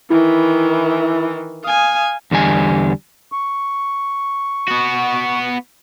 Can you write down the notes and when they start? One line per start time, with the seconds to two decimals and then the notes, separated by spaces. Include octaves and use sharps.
0.10 D#3 E3 E4
1.64 F5 G#5 D#6
2.31 E2 D3 G3 G#5
3.32 C#6
4.68 B3 F#4